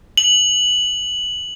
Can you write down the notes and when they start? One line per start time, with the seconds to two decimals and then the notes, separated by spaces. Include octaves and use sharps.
0.18 F#7